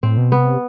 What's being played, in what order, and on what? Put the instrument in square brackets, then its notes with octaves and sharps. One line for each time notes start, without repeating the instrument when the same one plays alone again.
[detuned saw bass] A2 [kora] C4
[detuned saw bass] B2
[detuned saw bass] C3 [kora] B3